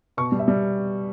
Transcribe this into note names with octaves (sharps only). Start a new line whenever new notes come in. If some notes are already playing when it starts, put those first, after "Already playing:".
B2 C#6
G3
E5
G3